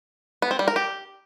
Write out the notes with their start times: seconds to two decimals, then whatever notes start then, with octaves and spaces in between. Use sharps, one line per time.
0.42 B3
0.51 C4
0.59 G3
0.68 A#4
0.76 G4